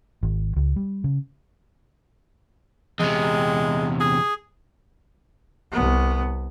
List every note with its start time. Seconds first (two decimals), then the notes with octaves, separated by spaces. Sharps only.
0.23 G#1
0.56 C#2
0.76 G3
1.04 C#3
3.00 E2 C3 G#3
4.00 G#4
5.72 C2 B3